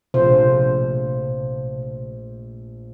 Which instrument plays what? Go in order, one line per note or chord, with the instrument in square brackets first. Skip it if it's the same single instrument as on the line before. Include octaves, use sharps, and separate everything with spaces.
[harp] A#1 A3 F4 [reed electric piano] C3 [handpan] C5